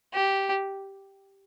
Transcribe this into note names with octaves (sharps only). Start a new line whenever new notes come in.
G4